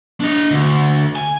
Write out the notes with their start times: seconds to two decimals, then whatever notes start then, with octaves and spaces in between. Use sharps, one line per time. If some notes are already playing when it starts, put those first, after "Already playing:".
0.21 D4 D#5
0.51 D2
1.15 G#5